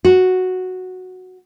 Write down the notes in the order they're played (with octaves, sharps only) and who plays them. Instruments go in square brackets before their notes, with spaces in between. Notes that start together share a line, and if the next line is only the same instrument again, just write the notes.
[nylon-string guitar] F#4